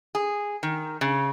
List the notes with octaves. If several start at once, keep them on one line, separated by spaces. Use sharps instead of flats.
G#4
D#3
C#3